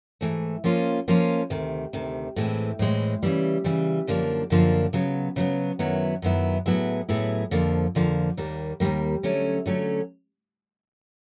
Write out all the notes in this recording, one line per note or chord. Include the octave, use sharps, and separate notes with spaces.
G#2 E3 A3
F3 A#3 C#4 F4
F3 A#3 C#4 F4
D2 C3 D#3
D2 C3 D#3
A2 E3 G#3 C4
A2 E3 G#3 C4
C#3 E3 G3
C#3 E3 G3
F#2 D3 F3 A#3 D4
F#2 D3 F3 A#3 D4
C#3 F#3 B3
C#3 F#3 B3
F#2 D#3 F#3 B3 E4
F#2 D#3 F#3 B3 E4
A2 F#3 B3 E4 G#4
A2 F#3 B3 E4 G#4
F2 D3 F3 A#3
F2 D3 F3 A#3
D#2 D#3 G3 A#3
D#2 D#3 G3 A#3
D3 F#3 A3 C#4
D3 F#3 A3 C#4